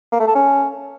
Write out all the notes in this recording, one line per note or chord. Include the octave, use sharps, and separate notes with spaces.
A#3
A3
A4
C#4